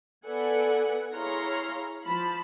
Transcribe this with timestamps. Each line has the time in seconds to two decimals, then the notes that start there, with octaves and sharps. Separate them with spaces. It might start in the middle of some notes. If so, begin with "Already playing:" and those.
0.24 B3 A4 B4 D5 F#5 G#5
1.13 E4 G#4 C#5 F5 A#5 C6
2.04 F3 A5 B5